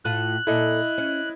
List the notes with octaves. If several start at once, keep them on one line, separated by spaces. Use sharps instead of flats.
A2 F4 F#6
A#2 E4 A4 D#5
C#4